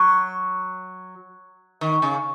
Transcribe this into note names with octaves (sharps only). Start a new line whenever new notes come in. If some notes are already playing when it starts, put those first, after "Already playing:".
Already playing: F#3
D#3
C#3